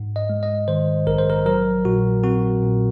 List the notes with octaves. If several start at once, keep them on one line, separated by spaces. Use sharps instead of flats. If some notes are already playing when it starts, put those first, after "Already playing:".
Already playing: G#2
D#5
G#3
D#5
D#3 C5
A#1 A#4
C5
A#4
F#3 A#4
A#2 F#4
C4 F#4
A#2